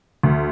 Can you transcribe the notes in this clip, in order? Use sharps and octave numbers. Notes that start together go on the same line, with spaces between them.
D2